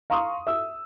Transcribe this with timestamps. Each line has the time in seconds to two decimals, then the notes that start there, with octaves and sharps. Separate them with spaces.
0.10 F5 A#5 C6 C#6 D#6
0.47 E5 E6